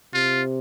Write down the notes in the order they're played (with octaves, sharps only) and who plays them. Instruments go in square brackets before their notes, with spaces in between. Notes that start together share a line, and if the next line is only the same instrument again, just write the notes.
[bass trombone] C3 [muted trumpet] F4